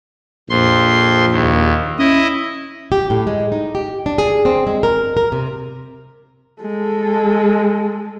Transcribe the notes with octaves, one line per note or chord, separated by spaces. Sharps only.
A#1 F2 C6
D#2
C#4 E4 D#5
G4
A2
G#3
D#4
G4
D4
G#4
C4
G#3
A#4
A#4
C3
G#3 A4